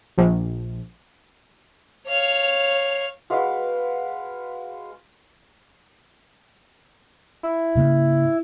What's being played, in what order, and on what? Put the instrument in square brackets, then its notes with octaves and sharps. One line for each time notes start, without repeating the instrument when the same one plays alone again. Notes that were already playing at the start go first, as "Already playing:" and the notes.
[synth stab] A#1
[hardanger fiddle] C#5 F5
[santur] G#3 F#4 B4 F5
[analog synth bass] E4
[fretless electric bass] G#2 C#3 A#3